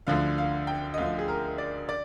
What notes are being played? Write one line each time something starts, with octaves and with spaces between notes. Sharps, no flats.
D2 D3 F3 F5
F5
G5
D#5
D2 D3 F3 F5
G#4
A#4
D5
D5